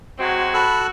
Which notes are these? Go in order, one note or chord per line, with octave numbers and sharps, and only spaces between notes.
F#3 G#3 C4 F#4
A4 B5 E6 F#6